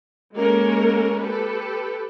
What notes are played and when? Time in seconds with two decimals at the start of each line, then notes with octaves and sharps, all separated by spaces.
0.36 G#3 A#3 C#4 A4 A#4
1.21 G4 A4 B4